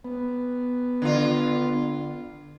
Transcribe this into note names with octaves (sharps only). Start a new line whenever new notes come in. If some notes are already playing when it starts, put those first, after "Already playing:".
B3
D3 F4